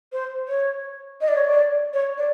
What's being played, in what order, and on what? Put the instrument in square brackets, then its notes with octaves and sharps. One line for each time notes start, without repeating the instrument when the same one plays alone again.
[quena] C5
C#5
D#5
D5
C#5
D5
C#5
D5